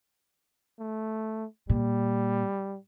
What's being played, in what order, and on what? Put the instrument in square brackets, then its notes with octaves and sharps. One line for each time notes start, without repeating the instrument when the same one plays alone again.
[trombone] A3
[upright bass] A#2 [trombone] G3